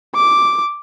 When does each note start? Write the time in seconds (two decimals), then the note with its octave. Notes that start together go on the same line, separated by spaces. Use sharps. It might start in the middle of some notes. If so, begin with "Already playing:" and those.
0.15 D6